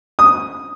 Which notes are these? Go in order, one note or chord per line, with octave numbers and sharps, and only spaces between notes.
D#6